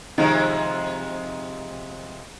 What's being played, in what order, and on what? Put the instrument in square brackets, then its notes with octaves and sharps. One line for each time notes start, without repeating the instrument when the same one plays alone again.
[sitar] C3 F3 G#3 [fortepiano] D#3